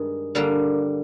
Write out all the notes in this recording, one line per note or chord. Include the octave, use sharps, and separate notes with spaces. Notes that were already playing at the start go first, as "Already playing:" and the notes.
Already playing: G2 D#3 G#3
D3 G3 A#3